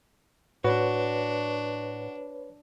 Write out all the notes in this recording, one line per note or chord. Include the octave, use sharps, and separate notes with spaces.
A2 D4 F#4 B4 C#5